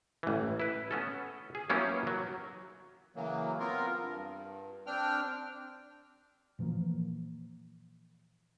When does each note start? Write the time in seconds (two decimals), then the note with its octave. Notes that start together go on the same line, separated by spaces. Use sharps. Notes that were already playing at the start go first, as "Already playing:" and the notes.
0.23 A1 E3
0.60 E4 B4
0.91 B3 C#4 A4
1.55 G#4
1.70 F#3 A#3 B3 C#4 E4 G4
2.07 F#3
3.16 C#3 E3 F#3 A#3
3.59 B3 C4 F4 A#4
4.01 G2
4.87 C4 D4 G5 F6
6.59 A#2 E3 F3 A#3